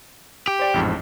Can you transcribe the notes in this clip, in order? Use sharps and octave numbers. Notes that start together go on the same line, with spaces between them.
G4
C5 D5 G5
A1 F2 G#2